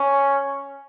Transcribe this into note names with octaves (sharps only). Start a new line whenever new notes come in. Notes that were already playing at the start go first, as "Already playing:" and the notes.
Already playing: C#4